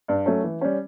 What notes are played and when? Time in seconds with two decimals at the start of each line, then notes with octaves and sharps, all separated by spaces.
0.08 G2
0.26 F#3 A3 C#4
0.44 E3
0.61 G3 C#4